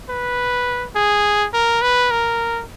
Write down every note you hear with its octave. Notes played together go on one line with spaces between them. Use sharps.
B4
G#4
A#4
B4
A#4